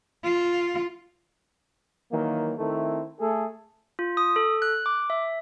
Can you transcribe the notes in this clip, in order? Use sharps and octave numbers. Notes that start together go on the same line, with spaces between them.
F4
D#3 E3 F#3 A#3
D#3 A3 C4 E4 A4
A3 G#4 A4
F4
D#6
A4
F#6
D6
E5